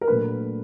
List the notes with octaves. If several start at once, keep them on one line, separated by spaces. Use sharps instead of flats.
A#4
A#2 F#3 A3 D4 B4